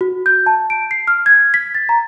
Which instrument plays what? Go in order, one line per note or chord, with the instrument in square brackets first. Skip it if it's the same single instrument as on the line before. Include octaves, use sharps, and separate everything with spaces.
[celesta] F#4
G6
A5
D7
C7
F6
G#6
B6
A6
A#5